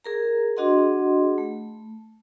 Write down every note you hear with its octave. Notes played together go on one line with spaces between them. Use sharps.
G#4 A#4 A#5
D4 F#4 G#4 D#5 F#5 C6
A3